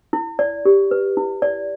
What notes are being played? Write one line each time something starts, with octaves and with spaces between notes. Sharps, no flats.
E4
D5
G4
B4
E4
D5